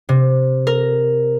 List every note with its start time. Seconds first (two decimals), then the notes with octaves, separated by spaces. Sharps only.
0.09 C3
0.67 A#4